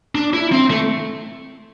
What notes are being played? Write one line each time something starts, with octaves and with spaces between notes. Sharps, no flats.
D4
E4
C4
A3